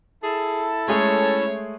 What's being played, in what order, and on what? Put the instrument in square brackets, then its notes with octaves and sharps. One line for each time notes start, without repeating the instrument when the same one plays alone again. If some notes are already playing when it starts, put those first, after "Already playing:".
[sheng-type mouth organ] E4 A4 A5 [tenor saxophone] G#4
[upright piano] G#3 A3 G#4 [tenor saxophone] C#4 [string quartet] C#5